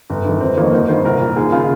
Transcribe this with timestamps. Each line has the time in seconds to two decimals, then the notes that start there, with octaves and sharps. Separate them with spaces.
0.10 G1
0.25 G2 D#3
0.41 G1 C4
0.57 F2 D#3 A#3
0.73 G#1 D#4
0.88 G2 D#3 C5
1.05 C2 A#4
1.21 A#2
1.36 D#2 G#4
1.52 C#3 F4